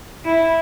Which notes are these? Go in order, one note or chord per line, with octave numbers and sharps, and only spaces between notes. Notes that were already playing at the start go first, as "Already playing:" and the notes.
E4